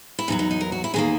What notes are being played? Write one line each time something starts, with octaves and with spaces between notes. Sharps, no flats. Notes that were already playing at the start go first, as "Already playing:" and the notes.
E4
E2 D#3 F#3 D#4
D#4
D#4
A#4
F#4
E4
E2 D#3 A#3 G#4